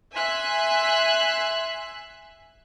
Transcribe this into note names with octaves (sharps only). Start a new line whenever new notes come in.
E5 G#5 C6 E6 F#6 B6